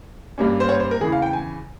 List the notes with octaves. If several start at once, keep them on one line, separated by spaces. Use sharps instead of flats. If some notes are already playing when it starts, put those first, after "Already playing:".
G2 G3 A#3 C#4
C5
C#5
C5
A#4
E2 C#3 E3 G#4
F5
G5
G#5